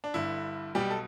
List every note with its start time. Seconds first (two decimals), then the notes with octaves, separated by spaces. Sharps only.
0.04 D4
0.14 G1 G2 D3 E4
0.75 B1 B2 G3 G4
0.90 A4